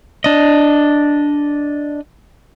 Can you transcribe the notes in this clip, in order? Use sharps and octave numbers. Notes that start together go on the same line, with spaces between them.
D4 D#5